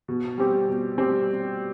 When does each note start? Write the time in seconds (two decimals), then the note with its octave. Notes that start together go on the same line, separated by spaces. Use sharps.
0.08 B2
0.38 G3 C4 G4
0.69 B2
0.98 G3 C4 G4